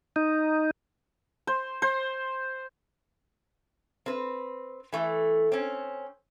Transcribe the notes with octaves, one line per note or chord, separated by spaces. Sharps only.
D#4
C5
C5
C4 B4
E3 A3
C4 C#4